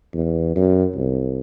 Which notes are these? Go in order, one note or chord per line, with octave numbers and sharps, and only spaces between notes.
E2
F#2
C2